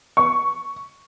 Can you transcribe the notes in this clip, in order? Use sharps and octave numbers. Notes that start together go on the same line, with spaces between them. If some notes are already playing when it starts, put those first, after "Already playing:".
C#6